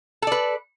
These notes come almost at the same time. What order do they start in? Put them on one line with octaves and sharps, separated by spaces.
A4 D5 B4